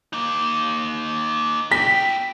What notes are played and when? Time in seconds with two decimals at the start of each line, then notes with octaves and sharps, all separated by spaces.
0.13 A#3 D#4
1.72 B3 G5 B6